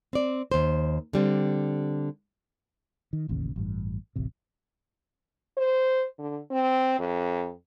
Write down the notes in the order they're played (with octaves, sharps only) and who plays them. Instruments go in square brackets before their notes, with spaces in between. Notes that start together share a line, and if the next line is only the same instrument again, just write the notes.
[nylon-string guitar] C4 D5
D#2 C5
D3 G3 C4
[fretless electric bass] D#3
E1 A1 D#2 C#3
A1 G2
D1 A1 C3
[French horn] C5
D3
C4
F2